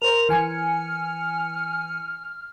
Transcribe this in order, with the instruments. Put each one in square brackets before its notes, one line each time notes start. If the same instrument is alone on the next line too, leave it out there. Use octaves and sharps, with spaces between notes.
[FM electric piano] A#4 C5 [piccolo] F7
[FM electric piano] E3 G#5 C#7 [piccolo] F6